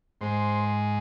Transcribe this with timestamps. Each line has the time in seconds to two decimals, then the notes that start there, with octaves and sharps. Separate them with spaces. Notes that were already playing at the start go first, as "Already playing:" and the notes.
0.21 G#2 G#3 C5